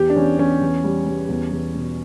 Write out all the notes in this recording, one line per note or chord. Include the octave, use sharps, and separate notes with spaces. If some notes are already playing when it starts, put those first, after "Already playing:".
Already playing: E2 G4
D4
E2 C#4
E2 C#4
E2
G3
G3
E2
E2
B2